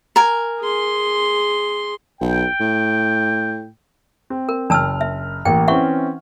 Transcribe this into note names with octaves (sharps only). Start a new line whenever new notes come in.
A#4 G#5
G#4 C6
B1 G5
A2
C4
A#4
F#1 D4 A5 E6 F6
E5
A1 A#3 G5
E3 C4 C#4 E5 F#5 C#6